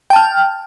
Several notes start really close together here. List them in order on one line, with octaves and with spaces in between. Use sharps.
G5 A5 F6